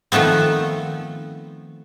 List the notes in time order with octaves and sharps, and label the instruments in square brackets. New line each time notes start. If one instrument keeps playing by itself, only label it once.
[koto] D#3 F3 A3 B3 C4